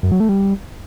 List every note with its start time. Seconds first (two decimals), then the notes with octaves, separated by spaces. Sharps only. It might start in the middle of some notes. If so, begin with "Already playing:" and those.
0.03 F#2
0.12 F#3
0.20 A3
0.29 G3